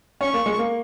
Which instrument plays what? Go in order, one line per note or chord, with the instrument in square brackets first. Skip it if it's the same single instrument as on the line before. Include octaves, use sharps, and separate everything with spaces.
[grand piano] C#4 [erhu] C#6
[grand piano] A#3
G#3
A#3